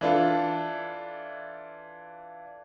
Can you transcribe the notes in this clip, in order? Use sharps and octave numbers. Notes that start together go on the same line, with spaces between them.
E3 D4 F4 A4